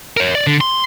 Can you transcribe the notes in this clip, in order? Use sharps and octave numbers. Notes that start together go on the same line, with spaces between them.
A#4 C#5
D5
D3
C6